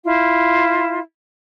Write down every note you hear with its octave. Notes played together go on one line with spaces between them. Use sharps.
E4 F4